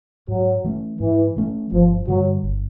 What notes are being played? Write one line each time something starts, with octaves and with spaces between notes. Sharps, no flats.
G#2 F#3
E3 A3 C#4
G#2 E3
E3 A3 C#4
G1 F3
G2 D3 F#3 G3
G1